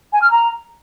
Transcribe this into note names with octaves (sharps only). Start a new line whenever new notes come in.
G#5
F6
A#5